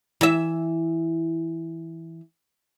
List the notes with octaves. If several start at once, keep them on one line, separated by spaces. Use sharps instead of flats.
E3 E5